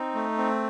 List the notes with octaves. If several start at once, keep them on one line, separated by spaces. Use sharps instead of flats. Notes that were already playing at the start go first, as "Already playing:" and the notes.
Already playing: C4 D#4
A3
C4